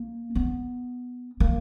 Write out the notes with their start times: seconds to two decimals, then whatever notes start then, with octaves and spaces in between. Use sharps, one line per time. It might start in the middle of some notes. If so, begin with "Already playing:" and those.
Already playing: A#3
0.35 B3
1.40 A#3